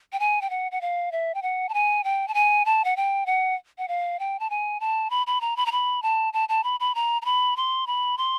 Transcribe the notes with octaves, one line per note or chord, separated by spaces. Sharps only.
G5
G#5
G5
F#5
F#5
F5
E5
G5
F#5
A5
G#5
G5
A5
G#5
A5
F#5
G5
F#5
F#5
F5
G5
A5
G#5
A5
B5
B5
A#5
B5
A#5
B5
A5
A5
A5
B5
B5
A#5
A#5
B5
C6
B5
C6